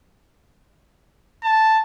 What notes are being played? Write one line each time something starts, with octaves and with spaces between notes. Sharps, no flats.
A5